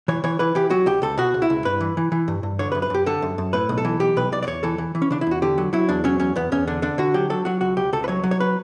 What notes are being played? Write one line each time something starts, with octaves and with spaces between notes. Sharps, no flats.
E3 C#5
E3 C#5
E3 B4
E3 G4
F#3 F#4
C#2 G4
C#2 A4
B2 F#4
C#2
E4
C#2
G2 B4
E3
E3
E3
G2
G2
D3 C#5
B4
F#2
B4
F#2 G4
D3 A4
F#2
F#2
A2 B4
B1
A4
E3
B1 G4
B1 B4
B1 D5
D5
E2 C#5
E3 A4
E3
E3
C#4
C#3 D4
E4
E2 F#4
D3 G4
F#3
F#3 E4
E2 D4
F#3 C#4
E2 C#4
E2 B3
E2 C#4
D3 D4
D3 D4
D3 F#4
F#3 G4
F#3 A4
F#3 F#4
C#2 F#4
C#2 G4
C#2 A4
B4
F#3 C#5
F#3
C#5
B4